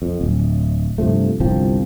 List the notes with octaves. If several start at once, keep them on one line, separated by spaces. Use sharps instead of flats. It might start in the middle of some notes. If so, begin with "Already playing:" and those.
F2
D1
G2 C3 F3 A3
G1 C2 F3 C4